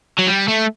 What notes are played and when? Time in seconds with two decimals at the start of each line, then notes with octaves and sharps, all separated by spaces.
0.18 F#3
0.27 G3
0.48 A3